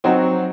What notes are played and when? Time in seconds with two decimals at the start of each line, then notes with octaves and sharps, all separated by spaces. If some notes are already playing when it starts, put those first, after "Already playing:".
0.04 F#3 C4 D#4 F#4